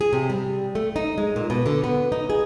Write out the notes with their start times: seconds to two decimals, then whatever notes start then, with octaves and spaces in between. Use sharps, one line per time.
0.01 G#4
0.13 C3
0.30 G3
0.75 A3
0.96 D#4
1.18 G#3
1.36 A#2
1.50 B2
1.66 D3
1.84 B3
2.12 D#4
2.30 G#4